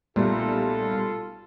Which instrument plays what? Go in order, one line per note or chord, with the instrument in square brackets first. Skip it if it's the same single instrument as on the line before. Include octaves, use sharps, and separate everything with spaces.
[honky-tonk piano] B1 G3 [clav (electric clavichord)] A#2 A3 [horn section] F4 A4